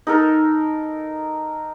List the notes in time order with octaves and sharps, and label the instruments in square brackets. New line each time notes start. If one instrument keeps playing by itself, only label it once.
[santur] D#4 A4 A#4